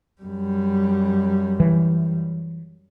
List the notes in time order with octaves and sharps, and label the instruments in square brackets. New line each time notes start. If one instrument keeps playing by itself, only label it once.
[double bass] F#2 G3
[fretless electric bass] E3